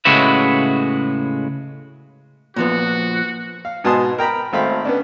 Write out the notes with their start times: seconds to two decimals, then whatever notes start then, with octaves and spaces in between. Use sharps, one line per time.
0.05 A2 C#3 G#3 F#4 B4 E5
2.56 A#2 F3 B3 F#4
3.65 F5
3.84 G#2 B2 G#5 A5 C6 D#6
4.18 A#4 G5 A#5 B5
4.53 G#1 A3 C4 F5 B5
4.85 B3 C#4 D4